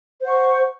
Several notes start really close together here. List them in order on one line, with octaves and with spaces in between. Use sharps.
C5 F#5 C#6